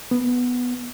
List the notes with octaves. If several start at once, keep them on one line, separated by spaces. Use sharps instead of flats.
B3